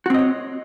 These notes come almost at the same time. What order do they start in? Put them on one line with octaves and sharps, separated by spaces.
F#4 C4 D#5 C#5